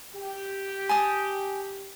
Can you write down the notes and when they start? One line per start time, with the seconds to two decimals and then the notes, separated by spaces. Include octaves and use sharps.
0.14 G4
0.89 G#5 A5 D#6